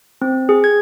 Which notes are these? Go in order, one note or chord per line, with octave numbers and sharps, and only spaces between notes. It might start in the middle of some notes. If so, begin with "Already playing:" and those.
C4
G#4
G#6